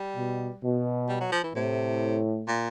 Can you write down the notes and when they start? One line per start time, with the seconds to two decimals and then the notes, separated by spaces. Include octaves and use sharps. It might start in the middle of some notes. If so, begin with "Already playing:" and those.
Already playing: G3
0.16 B2
0.63 B2
1.09 G3
1.20 F#3
1.32 F3
1.44 E3
1.55 A2 C3
2.48 A#2